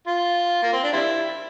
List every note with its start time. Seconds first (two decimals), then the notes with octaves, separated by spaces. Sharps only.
0.07 F4
0.63 A#3
0.73 C4
0.83 D4
0.93 G3 C4 E4